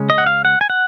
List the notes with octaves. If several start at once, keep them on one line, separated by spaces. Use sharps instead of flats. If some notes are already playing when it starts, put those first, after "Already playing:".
Already playing: C#3 G#3 C#4
D#5
F#5
F5
F#5
G#5
F#5